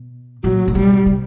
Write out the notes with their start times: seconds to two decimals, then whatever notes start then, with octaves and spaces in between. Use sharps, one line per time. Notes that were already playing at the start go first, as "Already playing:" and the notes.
Already playing: B2
0.44 A#2 F#3
0.68 A#2
0.75 B2 G3
1.06 C3